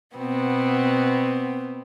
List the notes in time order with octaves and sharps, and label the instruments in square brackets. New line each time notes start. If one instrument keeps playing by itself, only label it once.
[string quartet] B2 B3 C4